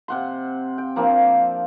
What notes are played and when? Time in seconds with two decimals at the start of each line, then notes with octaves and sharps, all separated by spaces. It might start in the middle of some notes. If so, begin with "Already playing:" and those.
0.08 C3 F#5 C6
0.78 G5
0.96 F3 A#3 C4 D4